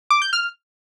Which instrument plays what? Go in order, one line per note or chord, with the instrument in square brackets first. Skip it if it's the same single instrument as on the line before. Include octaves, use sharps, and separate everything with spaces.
[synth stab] D6
G6
F6